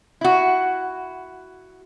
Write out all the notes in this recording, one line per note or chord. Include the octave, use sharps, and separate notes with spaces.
E4 F#4